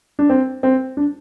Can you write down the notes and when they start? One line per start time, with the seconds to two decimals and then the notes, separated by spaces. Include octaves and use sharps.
0.19 D4
0.29 C4
0.63 C4
0.97 D4